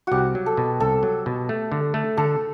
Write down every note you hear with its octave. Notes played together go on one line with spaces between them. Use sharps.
C2 F#4 G4
F#3
A4
B2
C2 A4
F#3
B2
A3
D3
A3
D3 A4